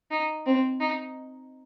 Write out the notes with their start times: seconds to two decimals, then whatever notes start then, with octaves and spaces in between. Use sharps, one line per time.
0.11 D#4
0.46 C4
0.80 D#4